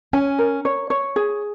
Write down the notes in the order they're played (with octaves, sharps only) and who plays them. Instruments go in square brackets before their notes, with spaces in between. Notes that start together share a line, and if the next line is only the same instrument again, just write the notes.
[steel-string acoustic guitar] C#4 [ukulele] G#5
[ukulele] A#4
C#5
C#5
G#4